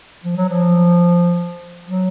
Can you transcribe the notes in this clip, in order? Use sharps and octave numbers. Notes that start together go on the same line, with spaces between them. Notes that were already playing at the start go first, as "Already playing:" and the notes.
F3
F#3
F3
F#3